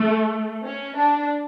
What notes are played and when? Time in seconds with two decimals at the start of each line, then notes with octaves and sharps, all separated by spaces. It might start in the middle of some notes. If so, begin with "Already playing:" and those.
Already playing: A3
0.64 C#4
0.97 D4